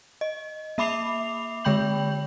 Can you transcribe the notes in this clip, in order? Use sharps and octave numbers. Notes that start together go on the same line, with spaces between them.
D#5
A#3 E5 B5 D6 C7 F7
D3 G#3 G5 B5 G6 F#7